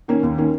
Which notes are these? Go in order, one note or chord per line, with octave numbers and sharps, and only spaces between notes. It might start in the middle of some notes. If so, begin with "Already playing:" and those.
D#3 A#3 C#4
D#2
D#3 A#3 C#4